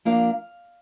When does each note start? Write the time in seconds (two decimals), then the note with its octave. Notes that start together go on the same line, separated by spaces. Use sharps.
0.05 F3 A#3 D4 F5